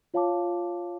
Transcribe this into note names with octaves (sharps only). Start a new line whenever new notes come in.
F4 C#5 F5 A5 D6